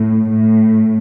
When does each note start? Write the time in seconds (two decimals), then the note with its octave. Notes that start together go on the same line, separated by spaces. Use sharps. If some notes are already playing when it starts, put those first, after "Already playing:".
Already playing: A2
0.30 A2